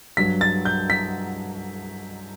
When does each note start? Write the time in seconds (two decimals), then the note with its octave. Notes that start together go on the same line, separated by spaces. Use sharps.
0.17 G2 F#3 B6
0.41 A6
0.65 G6
0.90 B6